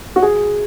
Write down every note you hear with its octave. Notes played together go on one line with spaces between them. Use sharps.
F#4
G#4